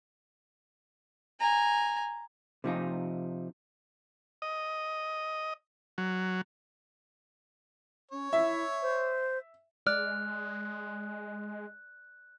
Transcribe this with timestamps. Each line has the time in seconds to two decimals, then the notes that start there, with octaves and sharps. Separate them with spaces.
1.40 G#5 A#5
2.64 C3 F3 D#4
4.42 D#5
5.98 F#3
8.11 C#4 C#5
8.33 E4 E5
8.82 C5
9.87 G#3 D5 F6 F#6